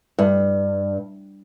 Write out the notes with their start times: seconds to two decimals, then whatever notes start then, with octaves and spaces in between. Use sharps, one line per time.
0.19 G2